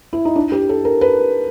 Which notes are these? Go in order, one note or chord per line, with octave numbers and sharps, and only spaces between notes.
E4
D#4
D4
G4
A4
A#4
B4